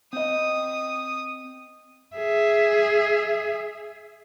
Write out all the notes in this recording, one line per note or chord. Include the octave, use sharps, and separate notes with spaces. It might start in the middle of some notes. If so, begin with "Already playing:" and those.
C4 D#5 D#6
G#4 E5